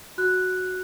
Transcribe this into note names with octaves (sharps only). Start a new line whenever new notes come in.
F#4 F#6